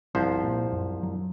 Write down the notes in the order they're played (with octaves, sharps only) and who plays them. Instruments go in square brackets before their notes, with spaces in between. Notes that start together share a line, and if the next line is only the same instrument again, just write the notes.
[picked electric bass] G1 [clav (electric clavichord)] C2 F3 C5
[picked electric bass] A#2
F#2
F#3